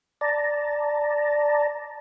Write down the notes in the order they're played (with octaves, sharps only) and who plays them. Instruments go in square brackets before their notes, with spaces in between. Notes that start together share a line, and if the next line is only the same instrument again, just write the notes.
[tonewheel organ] D5 A5 A#5